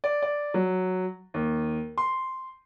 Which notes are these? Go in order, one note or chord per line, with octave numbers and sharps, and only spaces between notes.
D5
D5
F#3
D#2
C6